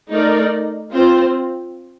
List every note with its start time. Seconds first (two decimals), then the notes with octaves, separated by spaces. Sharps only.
0.10 A3 D#4 A#4 D5
0.91 C4 F4 C5